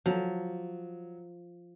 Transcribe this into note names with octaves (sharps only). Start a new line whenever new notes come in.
F3 F#3